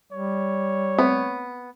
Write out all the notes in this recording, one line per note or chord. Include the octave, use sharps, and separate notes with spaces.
G3 C#5
A3 B3 C4